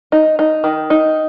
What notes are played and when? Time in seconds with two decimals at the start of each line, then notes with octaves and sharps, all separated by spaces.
0.12 D#4
0.39 D#4
0.64 D#3
0.90 D#4